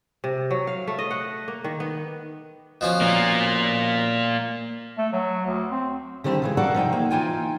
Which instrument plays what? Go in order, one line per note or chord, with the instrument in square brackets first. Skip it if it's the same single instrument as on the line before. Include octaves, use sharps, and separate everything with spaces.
[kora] C3
F#3
F5
A3
D#5
F#5
A#3
D#3
B3
[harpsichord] B2 F3 C#4
[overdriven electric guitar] A#3 F4
[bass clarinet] A3
F#3
D2
C4
[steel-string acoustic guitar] D3 D#3 G3 C4 E4
C#3 E3 G#3
F#4 A4 A#4 D5 F5 F#5
C3 F3 D#4 G5
A#3
E3 F#3 D#4 F4 G5 G#5